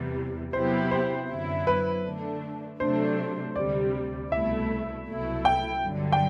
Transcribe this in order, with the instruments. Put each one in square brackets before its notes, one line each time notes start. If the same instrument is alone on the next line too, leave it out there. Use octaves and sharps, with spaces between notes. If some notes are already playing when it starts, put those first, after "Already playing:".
Already playing: [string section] E2 C3 E3 G3
[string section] C3 F#3 B3 E4 G4 [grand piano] C5
[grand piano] C5
[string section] F#2 D3 F#3 B3 E4
[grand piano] B4
[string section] D3 A3 D4
[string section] C3 F#3 A3 D4 [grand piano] C5
[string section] D2 C3 G3 [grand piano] D5
[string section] C2 B2 A3 E4 [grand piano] E5
[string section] C2 B2 F#3 A3 E4
[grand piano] G5
[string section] G2 D3 F#3
[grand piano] G5